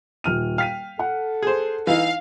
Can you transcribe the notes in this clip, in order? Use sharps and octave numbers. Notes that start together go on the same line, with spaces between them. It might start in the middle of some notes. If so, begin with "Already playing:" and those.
D#1 F6 D#7
F5 G5 B6 D#7
A4 F#5
G#4 C5
E3 D#4 F5